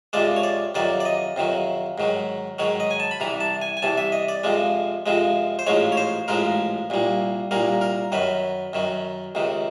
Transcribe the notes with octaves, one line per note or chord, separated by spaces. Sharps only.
F2 C3 F3 G#3 D5
C#5
D5
F2 C3 D#3 F#3 D5
D5
D#5
F2 C3 D#3 F#3
G#2 D#3 F#3
G#2 D#3 F#3 C#5
D#5
G#5
A5
B5
C2 C3 E3 A#5
A5
G#5
G#5
C2 C3 E3 A5
E5
D#5
D5
F2 C3 F3 G#3
F2 C3 F3 G#3
C5
A1 G#2 F3 G#3 C#5
C#5
C5
A1 G#2 F3 G#3 A#4
C2 A#2 G3
C2 A#2 G3 A#4
A#4
F#2 D#3 F#3 B4
F#2 D#3 F#3
C#2 C3 D#3